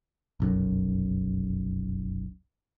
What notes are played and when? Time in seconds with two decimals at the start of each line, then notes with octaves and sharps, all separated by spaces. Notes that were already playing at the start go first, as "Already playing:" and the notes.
0.40 F1 B1 F#2